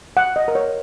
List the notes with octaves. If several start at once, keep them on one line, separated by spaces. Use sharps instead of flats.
F#5
D#5
A#4
C#5